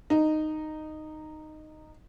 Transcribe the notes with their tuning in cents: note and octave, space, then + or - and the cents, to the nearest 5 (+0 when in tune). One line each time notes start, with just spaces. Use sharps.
D#4 -10